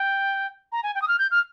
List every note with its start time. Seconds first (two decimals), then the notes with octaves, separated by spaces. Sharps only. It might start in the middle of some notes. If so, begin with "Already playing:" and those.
Already playing: G5
0.72 A#5
0.83 G#5
0.95 G5
1.02 D#6
1.08 F6
1.19 G6
1.31 F6